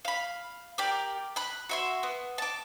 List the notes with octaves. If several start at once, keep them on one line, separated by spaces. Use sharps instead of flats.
F5 B5
G4 A#4 D5
B5 F#6
F#4 E5 C6
B3
A5 D6